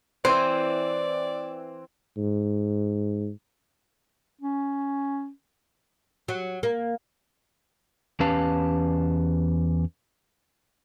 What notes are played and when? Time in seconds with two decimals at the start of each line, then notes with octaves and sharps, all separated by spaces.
0.25 E3 C4 C5 D5
2.17 G#2
4.41 C#4
6.28 F#3
6.63 A#3
8.20 E2 C#4 G4 B4 F5 A5